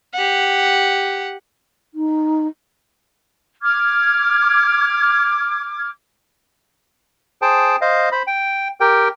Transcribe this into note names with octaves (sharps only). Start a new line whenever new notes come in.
G4 F#5
D#4
D6 F6 G#6
G#4 C5 G5 A5
C5 D#5 F5
C5 B5
G5
G4 A#4 G5